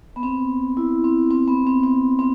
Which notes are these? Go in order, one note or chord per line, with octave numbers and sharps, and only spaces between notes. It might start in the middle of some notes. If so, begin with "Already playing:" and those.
B3
C4
E4
C4
C4
B3
C4
C4
C4